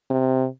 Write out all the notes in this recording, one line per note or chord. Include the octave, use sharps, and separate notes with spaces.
C3